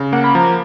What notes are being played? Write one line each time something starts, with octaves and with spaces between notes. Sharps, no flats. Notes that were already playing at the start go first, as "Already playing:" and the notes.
Already playing: C#3
A#3 F#5
B5
F3 A#5